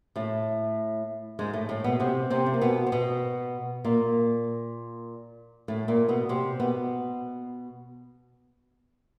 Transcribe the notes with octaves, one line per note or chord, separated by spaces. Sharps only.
A2 A3
G#2 G#3
A2 A3
A2 A3
B2 B3
C3 C4
C3 C4
A3
A#3
B2 B3
C4
B2 B3
A#2 A#3
A2 A3
A#2 A#3
B2 B3
C3 C4
B2 B3